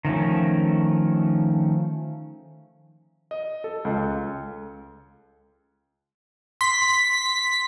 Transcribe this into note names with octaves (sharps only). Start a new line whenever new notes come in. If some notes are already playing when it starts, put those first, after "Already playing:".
D#3 F3 A3 C#4
D#5
A4
C#2
C6 B6